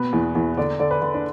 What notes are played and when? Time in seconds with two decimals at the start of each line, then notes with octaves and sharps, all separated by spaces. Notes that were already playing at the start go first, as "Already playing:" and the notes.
Already playing: B2 B4
0.13 E2
0.35 E2
0.57 D3 D5
0.80 D3 D5
0.91 B4
1.02 D3
1.14 D4